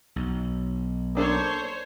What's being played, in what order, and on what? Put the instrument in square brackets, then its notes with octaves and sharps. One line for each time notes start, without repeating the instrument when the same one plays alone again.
[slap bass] B1
[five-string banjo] A#3 D4 A4 [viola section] C5 C#5